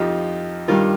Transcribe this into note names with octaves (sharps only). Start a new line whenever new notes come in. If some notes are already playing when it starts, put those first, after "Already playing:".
Already playing: F2 F3 D#4 G4
G2 D#3 G3 F4 A#4